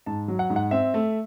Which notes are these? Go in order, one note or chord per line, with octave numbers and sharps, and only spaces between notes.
G#2 A5
F#3
F#5
G#2
F#5
C4 E5
A3